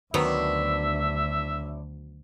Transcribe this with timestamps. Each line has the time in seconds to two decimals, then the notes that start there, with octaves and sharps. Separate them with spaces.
0.14 D2 A2 D#3 F#3 B3 C4 D4 E5